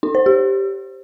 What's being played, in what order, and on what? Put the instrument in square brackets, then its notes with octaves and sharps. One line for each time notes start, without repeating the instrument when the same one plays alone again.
[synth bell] D#4
C5
G4